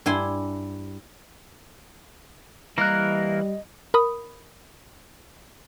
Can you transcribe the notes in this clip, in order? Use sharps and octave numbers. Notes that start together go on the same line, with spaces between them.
G2 E4 G#5 C6
E3 G3 A#3 A#4 D#5 F#6
A#4 B5 D#6